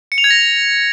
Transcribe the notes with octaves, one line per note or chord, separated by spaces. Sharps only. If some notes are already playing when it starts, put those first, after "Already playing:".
C#7
F7
G#6
A#6